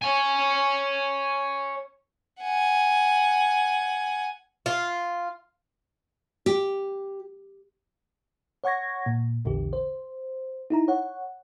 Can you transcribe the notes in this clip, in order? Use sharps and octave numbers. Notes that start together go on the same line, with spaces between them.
C#5 G#5
F#5 G#5
F4
G4
C#5 F#5 C#6 G#6 A#6
A#2
A#1 E2 D3 G4
C5
D#4 E4 A#5
C#5 F#5